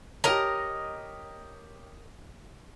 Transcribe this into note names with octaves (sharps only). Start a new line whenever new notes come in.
G4 A#4 C#5 D#5 A#5